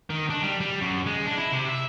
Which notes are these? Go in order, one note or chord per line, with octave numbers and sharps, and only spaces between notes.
D#3
D4
G3
G3
F#2
G#3
D4
E4
C3
E5